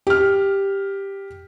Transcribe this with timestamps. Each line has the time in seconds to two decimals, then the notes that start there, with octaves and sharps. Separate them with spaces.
0.07 G4 F6